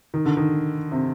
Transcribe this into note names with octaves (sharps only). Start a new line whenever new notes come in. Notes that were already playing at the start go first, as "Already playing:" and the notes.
D#3
D3
D#3
C3